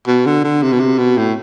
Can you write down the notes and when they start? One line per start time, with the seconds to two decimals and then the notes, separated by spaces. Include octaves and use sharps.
0.07 B2
0.26 D3
0.44 D3
0.63 C3
0.73 B2
0.80 C3
0.98 B2
1.17 A2